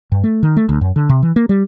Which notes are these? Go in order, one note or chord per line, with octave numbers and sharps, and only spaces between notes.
G2
A3
D#3
A3
D2
F#2
D3
C3
E3
A#3
G3